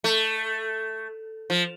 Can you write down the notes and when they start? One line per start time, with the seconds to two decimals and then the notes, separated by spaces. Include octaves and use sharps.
0.04 A3
1.50 F3